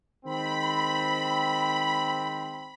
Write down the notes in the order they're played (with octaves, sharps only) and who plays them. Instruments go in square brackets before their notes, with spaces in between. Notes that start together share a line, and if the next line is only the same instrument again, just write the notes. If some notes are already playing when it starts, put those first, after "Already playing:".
[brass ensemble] D#3 G#3 C4 [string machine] B5